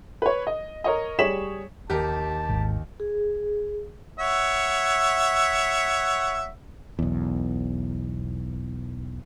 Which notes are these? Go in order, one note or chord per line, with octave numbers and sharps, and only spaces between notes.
B4 C#5
D#5
A#4 C#5 D#5
G3 G#4 C#5 B6 E7 F#7
D#2 G4 A#4 A5
G#1
G#4
C#5 E5 F#5
B1 E2